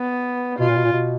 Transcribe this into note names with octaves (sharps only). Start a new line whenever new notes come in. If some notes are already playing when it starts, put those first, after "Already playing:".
Already playing: B3
B2 F4
A#2
B2
A#2
B2